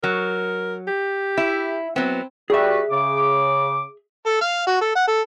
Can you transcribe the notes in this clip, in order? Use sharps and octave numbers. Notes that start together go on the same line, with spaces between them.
F#3 A#4
G4
E4
F#3 B3 C4
G3 F#4 G#4 B4 E5
C#3 D6
A4
F5
F#4
A4
F#5
A4